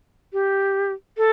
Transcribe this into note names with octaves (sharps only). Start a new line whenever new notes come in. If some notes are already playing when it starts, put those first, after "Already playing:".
G4
A4